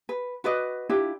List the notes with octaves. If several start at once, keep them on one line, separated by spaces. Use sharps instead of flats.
B4
F#4 B4 D5 D#5
D4 E4 F4 G4